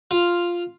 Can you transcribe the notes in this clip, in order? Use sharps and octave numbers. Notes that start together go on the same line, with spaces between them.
F4